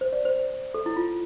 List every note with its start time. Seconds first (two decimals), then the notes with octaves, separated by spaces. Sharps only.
0.01 C5
0.13 D5
0.25 C5
0.74 A4
0.86 E4
0.96 F4